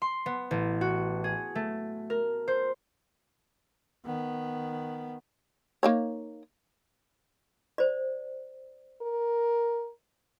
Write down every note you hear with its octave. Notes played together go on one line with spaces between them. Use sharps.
C6
B3
A1
F#4
G#4
A3
A#4
C5
D#3 B3
A#3 D#4 C#5
C5 D5
A#4